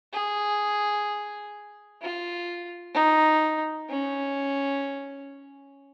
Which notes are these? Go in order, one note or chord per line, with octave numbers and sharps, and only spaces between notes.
G#4
F4
D#4
C#4